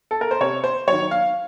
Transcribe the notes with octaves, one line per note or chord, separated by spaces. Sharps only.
A4
A#4
C5
C3 C#5
C5
D#3 F#3 C#5
F5